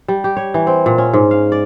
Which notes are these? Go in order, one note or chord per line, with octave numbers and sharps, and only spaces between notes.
G3
G4
C#5
E3
C4
A#2
C#4
G#2
F5
D5